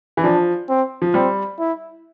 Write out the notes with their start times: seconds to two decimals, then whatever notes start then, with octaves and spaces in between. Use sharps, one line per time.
0.17 E3
0.24 F3 D4
0.69 C4
1.02 F3
1.14 G3 C4
1.59 E4